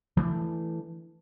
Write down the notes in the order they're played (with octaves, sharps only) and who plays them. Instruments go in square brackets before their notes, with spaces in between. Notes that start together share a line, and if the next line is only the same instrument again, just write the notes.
[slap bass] E3 A3 D4